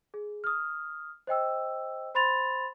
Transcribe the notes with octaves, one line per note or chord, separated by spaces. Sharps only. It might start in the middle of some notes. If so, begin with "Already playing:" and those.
G#4
D#6 F6
C5 D#5 G5 E6
C5 B5 C6 A6 F7